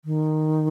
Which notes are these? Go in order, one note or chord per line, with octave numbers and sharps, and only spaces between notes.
D#3